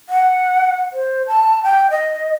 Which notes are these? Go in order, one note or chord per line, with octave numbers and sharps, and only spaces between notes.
F#5
C5
A5
G5
D#5